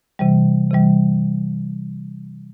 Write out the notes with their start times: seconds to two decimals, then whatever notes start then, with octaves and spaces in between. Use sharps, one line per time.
0.19 C3 E3 G3
0.71 C3 E3 G3